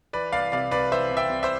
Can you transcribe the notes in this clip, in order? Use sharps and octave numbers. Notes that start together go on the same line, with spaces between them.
E3 B4 D5
C2 D5 F5
C3 D5 F5
C2 B4 D5
E3 C5 E5
C2
E5 G5
C3
C5 E5